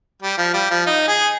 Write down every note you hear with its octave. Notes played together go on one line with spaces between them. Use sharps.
G3
F3
G3
F3
D#4
G#4